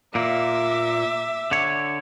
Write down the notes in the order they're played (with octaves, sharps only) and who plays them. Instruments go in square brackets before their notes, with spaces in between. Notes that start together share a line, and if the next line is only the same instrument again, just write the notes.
[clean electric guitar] A#2 A#3 [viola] E5 D6
[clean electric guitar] D3 C#5